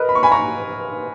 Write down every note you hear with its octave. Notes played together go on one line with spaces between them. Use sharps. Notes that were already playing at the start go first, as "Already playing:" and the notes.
Already playing: A#4 B4 D#5
B5
C#6
G#5 B5
A#5 C#6